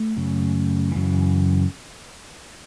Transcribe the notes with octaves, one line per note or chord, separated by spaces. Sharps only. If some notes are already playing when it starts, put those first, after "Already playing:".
Already playing: A3
F#2 C#3
F#2 C#3 E3